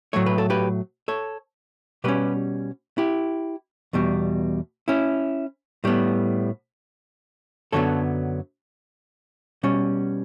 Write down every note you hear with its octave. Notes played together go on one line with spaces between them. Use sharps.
A2 F#3 A3 C#5
B4
A4
G4 B4
A4 C#5
B2 G3 C#4 G4 B4
E4 G4
E2 B2 G3
C#4 E4
A2 G3 B3
F#2 D3 F#3 B3 A4 C#5
B2 G3 C#4